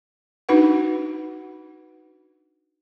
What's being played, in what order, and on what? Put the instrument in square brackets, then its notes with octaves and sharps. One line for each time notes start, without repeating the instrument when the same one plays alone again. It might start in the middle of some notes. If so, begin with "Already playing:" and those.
[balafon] D4 D#4 F#4 B4 F#5